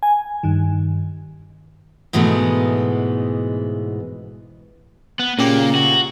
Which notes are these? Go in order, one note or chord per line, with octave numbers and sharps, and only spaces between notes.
G#5
G2 D#3
G#2 B2 E3 G#3 A3 B3
B3 F#6
A#2 C#3 A#3 G4
F#4